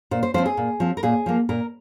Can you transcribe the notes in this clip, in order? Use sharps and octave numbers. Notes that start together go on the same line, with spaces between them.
A#2 C5
C5
F3 C4 C5
G#4
A#2
F3 C4
A#4
A#2 G#4
F3 A#3
A#2 A#4